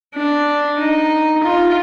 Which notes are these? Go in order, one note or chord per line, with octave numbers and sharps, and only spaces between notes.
D4
D#4
F4